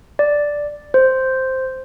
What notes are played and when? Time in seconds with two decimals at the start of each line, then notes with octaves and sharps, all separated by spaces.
0.19 D5
0.94 C5